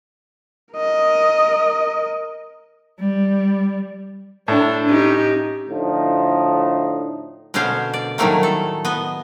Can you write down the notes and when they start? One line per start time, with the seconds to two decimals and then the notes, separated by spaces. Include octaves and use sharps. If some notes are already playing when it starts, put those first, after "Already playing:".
0.75 A#4 D#5
3.00 G3
4.48 A2 D4
4.89 C#4 D#4 G4
5.70 A2 D3 F3 D#4
7.54 B2 D3 B3 C#4 C5 F5
7.93 D5
8.18 A2 D#3 F#3 G3 A3 A#3
8.43 A4
8.85 B3 D#5